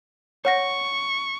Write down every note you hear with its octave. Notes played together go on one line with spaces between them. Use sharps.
C#5 F#5 C#6 A#6